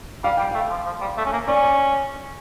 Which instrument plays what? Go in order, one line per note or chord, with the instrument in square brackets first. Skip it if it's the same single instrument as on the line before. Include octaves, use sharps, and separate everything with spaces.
[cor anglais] G3 [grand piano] F5
[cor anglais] G3 [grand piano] G5
[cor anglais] A3 [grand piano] F5
[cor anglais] F3
F3
G3
A3
C#4
A#3
[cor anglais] C#4 [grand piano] D5
[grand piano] D5